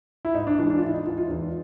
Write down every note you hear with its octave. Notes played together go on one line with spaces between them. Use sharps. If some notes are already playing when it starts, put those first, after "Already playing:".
E4
G#2 D#4
D4
E3 G#3 D4
D4
F4
G#2 E4
D#4
E3 G#3 F4
F4
E2